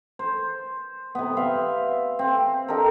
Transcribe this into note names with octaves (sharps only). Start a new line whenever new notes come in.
C5
C3 B3
B4 C5 E5 F5
C4
D#4 G4 A4 A#4